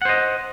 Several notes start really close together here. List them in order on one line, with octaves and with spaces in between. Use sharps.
F#5 C5 D#5